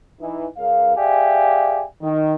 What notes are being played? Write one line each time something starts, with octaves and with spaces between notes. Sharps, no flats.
E3 D#4
C#2 C#3 A#4 F5
G4 G#4 D5 E5 F5 G#5
D#3